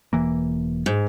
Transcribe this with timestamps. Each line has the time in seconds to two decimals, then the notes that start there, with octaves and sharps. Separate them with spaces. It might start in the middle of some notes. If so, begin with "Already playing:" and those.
0.13 E1 E3 A#3
0.86 G#2